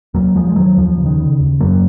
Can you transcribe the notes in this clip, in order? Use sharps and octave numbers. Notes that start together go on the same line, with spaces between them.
D#2 F#3 A#3
D#2 F3 G#3
G#3
D#2 D#3 F#3
D#2 F3
C#3
D#3
C#3
D#2
F#2 F#3 A#3